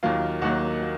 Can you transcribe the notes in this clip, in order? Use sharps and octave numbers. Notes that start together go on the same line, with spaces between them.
D#2 D#3 F#3 A#3 F4 F5
D#2 D#3 F#3 A#3 F#4 F#5
A#3